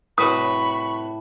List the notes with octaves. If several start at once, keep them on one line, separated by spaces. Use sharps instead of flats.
C2 A2 F#4 B4 B5 C#6 D#6